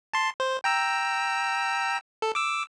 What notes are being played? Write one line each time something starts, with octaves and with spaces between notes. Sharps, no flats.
A5 C6
C5
G5 A#5 E6
A4
D6 E6